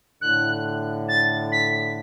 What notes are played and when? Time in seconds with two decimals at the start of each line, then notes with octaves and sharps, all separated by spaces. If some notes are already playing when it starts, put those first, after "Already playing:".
0.21 A2 D3 F#6
1.09 A6
1.52 B6